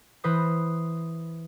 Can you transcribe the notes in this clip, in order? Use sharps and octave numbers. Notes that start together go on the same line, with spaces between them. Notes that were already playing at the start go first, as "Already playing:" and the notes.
E3 B4 C5 D#6